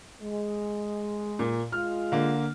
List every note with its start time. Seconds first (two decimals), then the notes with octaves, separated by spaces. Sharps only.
0.22 G#3
1.39 A#2
1.72 G#3 F4 F6
2.12 D3 A#3